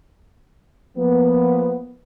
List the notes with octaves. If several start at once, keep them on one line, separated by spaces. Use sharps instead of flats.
F3 A#3 B3